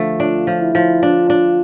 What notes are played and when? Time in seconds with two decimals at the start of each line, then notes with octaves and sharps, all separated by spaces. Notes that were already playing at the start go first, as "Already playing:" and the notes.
Already playing: D3 F3 A3
0.19 D4 F4
0.47 F3
0.61 E4
0.75 F3
1.02 D4 F4
1.30 D4